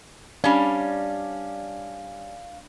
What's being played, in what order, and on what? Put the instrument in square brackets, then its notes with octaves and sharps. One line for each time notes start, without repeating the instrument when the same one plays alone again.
[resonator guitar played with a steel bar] G3 C#4 [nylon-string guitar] D4 [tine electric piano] F5